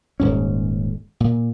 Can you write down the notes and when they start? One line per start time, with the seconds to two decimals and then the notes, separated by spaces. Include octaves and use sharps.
0.20 D#1 G#2 C#4
1.20 A#2